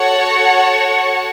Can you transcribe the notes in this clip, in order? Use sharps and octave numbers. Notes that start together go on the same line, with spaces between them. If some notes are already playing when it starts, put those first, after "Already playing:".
Already playing: F#4 A4 C#5 F#5 A5